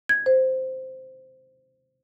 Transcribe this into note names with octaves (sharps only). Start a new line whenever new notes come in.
G#6
C5